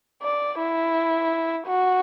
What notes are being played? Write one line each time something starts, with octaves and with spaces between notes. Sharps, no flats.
D5
E4
F#4